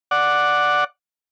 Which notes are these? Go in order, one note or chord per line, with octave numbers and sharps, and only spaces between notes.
D5 F#5